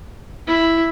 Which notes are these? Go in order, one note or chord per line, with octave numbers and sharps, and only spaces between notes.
E4